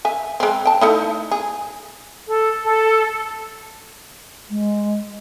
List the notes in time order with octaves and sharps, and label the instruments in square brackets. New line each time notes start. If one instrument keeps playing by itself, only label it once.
[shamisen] E5 G#5
G#3 C4
G5 A5
A3 D#4 E4
G#4
[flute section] A4
A4
[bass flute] G#3